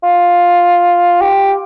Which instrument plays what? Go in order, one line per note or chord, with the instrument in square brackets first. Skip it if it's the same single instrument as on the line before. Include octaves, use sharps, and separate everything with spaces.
[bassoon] F4
G4